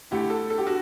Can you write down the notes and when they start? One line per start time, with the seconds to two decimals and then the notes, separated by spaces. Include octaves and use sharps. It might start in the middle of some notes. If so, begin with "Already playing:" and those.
0.11 D3 A3 E4 G4
0.30 A4
0.50 A4
0.58 G4
0.67 F#4